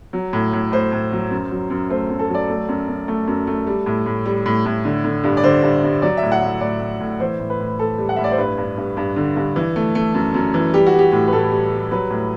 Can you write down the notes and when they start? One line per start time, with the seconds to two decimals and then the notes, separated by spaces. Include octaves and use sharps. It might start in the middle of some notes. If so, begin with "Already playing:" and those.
0.13 F#3
0.33 A2
0.53 A2
0.72 A2 C5
0.92 A2
1.12 F#3
1.31 F#2
1.51 F#3
1.70 F#2
1.90 A3 C5
2.10 F#2
2.19 A4
2.30 F#3 D5
2.49 A3
2.69 F#2
2.89 F#2
3.08 A3
3.27 F#2
3.47 A3
3.67 G3
3.86 A2
4.06 A2
4.26 G3
4.46 A2
4.65 A2
4.85 D3
5.04 D3
5.24 G2
5.37 D5
5.44 D3 C5
5.63 G2
5.83 G2
6.02 F#3 D5
6.17 E5
6.23 A2
6.32 F#5
6.42 A2 E5
6.61 A2 D5
6.81 A2
7.01 A2
7.20 E3 C5
7.40 A2
7.50 B4
7.60 A2
7.79 A2 A4
7.98 G3
8.09 F#5
8.16 A2 E5
8.24 D5
8.31 C5
8.38 G2 B4
8.58 G2
8.77 G2
8.97 G2
9.16 D3
9.36 G2
9.56 E3
9.76 A3
9.95 A3
10.14 F#2
10.34 F#2
10.54 E3
10.74 G3 G4
10.86 F#4
10.93 G3
10.99 G4
11.12 A2
11.28 B4
11.32 A2 A4
11.52 G3
11.72 G3
11.91 F#3 B4
12.10 A2